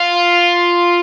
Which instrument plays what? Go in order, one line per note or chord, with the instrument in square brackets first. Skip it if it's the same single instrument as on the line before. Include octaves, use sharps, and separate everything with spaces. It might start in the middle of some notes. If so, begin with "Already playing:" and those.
Already playing: [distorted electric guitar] F4